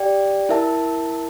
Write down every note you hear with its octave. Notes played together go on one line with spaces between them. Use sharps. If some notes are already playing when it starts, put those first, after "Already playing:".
Already playing: G4 D5 G5
E4 A#4 E5 A5